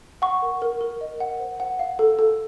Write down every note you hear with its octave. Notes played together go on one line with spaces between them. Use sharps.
F#5 C#6
A#4
A#4
A#4
D#5
F#5
C5
F#5
F5
A4
A4